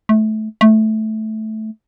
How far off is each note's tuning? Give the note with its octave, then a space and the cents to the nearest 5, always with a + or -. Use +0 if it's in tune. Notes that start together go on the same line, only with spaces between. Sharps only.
A3 -20
A3 -10